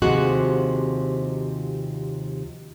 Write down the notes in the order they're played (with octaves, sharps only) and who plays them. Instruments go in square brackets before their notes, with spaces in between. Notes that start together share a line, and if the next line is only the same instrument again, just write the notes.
[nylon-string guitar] D#2 C3 F3 G#3 F#4 F#5